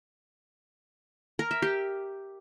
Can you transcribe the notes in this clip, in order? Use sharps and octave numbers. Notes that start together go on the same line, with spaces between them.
A#4
E5
G4